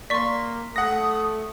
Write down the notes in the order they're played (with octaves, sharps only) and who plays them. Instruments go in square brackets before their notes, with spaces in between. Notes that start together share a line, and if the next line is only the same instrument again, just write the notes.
[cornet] A#3 [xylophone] D5 C#6 [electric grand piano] C6 B6
[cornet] A3 [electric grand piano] F#5 A#6 [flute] D#6